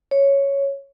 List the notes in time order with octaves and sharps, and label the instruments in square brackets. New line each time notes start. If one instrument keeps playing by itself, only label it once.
[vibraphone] C#5